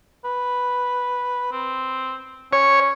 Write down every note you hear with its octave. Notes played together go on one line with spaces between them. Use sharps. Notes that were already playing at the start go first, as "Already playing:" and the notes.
B4
C4
C#4 C#5